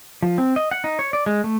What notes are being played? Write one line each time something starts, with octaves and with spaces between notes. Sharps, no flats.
F3
C4
D#5
F#5
D#4
C#5
D5
G#3
A3